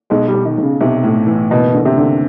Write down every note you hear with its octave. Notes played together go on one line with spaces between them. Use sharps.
B1 G#3
G3
B1
D#3
B1 C#3
B1 C3
A2
E3
F#1 B2
D3
C3
D3